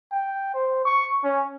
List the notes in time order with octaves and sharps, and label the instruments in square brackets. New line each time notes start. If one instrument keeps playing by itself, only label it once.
[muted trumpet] G5
C5
C#6
C#4